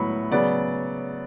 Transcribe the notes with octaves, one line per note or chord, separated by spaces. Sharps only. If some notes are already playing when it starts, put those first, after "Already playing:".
Already playing: A2 F#3 B3 B5 C#6
C#3 F#3 B3 D5